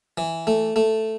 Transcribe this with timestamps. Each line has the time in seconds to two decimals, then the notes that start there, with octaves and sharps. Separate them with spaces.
0.18 E3
0.47 A3
0.76 A3